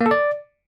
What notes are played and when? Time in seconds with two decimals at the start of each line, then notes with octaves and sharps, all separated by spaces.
0.01 A#3
0.06 A4
0.11 D5